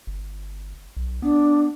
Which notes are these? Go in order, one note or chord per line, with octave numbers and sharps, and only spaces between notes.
G1
B1
B3 D4